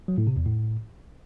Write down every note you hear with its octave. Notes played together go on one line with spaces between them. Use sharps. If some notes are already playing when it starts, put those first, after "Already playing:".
F#3
A2
C3
E2
A2